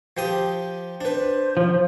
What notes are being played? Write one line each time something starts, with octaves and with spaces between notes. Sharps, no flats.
F3 G4 D#6
D4 B4 C5
F3